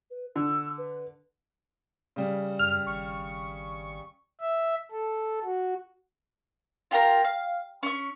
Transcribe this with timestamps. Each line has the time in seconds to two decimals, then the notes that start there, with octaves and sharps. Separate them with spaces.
0.10 B4
0.36 D3 E6
0.78 B4
2.16 C#3 G3
2.59 F#2 F6
2.86 G#1 C#6
4.41 E5
4.92 A4
5.44 F#4
6.91 F4 G4 A#4 A#5
7.24 F5
7.83 C#4 C#6